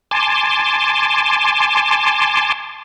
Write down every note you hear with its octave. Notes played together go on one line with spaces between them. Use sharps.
G#5 A5 C6 D6